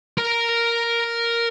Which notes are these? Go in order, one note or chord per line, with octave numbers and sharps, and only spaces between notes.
A#4 A#5